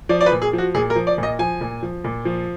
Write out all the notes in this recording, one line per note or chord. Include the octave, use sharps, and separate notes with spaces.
F3 D5
D5
B4
A#2
G#4
F3
F#4
A#2 G#4
A#4
F3
D5
A#2
D#5
F3 G#5
A#2
F3
A#2
F3